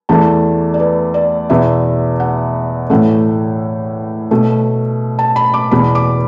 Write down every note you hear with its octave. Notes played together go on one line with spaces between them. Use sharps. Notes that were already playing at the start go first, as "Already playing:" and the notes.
E2 E3 A3 A5
D5
B4
D5
E2 B2 B3 E5
F#5
A2 E3 A3 F#5
B2 A3
A5
B5
D6
E2 B2 B3 B5
D6